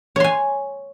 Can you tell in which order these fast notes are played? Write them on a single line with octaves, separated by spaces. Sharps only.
C#5 C6 G#5